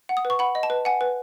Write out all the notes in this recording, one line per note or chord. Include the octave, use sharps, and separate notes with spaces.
F#5
D#6
B4
C#6
F#5 B5
D#5
A5
B4
F#5 G#5
B4